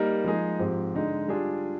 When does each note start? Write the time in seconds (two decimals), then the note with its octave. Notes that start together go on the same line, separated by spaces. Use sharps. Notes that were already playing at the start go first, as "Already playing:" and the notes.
Already playing: G3 A#3 D#4 A#4
0.24 F3 G#3 D#4 G#4
0.59 G#2 F3 C4 G4
0.94 D3 G#3 D#4
1.28 G3 D4 F4 G#4